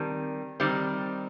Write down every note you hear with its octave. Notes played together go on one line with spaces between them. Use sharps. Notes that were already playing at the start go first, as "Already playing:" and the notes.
Already playing: D#3 G3 C4 A5
D#3 G3 C4